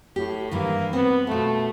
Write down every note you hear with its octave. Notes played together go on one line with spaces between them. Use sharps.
A2 G4
G2 D#3 E3 A#3
B3 C4
B2 A3 F4